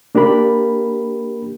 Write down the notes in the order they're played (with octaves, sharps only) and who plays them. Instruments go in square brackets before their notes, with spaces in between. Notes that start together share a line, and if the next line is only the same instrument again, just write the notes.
[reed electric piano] A#3 D4 G4 A#4 B5